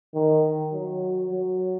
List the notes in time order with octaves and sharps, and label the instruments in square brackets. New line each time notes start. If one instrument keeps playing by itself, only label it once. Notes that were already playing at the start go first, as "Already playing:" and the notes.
[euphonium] D#3
F#3
F#3